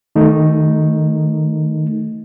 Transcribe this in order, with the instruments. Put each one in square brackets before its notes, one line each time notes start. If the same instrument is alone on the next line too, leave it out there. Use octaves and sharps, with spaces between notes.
[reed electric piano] D#3 A3 D#4